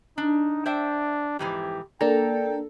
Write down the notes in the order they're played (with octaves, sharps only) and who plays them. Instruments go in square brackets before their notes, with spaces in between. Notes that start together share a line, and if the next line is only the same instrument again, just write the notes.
[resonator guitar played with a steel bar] D4 [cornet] D#4
[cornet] D4 [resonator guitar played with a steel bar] C5 E5 G5
[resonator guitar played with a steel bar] F2 G#2 E3 [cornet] G4
[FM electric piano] A#3 D4 A#5 [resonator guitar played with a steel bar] A4 [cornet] G5